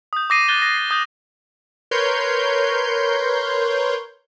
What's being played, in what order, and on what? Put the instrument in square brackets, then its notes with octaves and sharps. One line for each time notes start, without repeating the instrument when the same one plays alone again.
[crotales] D#6 G6
D6 D#6 A#6 C7 D#7
F#6 G6 A6 G7
A#6
C7
D#6 G6
[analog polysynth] A#4 B4 C#5 C6 G6